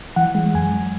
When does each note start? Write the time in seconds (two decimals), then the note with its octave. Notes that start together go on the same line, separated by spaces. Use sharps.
0.16 E3 F#5
0.35 G#3
0.54 F#2 G#5
0.74 F#2